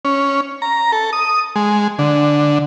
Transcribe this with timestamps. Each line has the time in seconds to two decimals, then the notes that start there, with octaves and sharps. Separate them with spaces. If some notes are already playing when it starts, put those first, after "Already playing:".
0.05 C#4
0.62 A#5
0.92 A4
1.13 D#6
1.56 G#3
1.99 D3